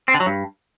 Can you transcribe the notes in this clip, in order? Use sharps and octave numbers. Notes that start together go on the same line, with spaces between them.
C4
D3
F#3
G2